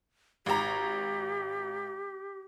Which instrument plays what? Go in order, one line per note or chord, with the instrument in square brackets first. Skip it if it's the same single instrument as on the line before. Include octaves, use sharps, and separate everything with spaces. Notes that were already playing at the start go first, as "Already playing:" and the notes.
[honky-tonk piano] G#1 A#5 [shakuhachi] G4